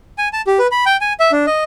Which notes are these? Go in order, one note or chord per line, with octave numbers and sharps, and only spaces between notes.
G#5
A5
G4
B4
B5
G5
G#5
E5
D4
D#5